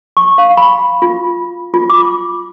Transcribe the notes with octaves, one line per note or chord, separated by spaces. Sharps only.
C#6
F5
B5
F4
F4
D6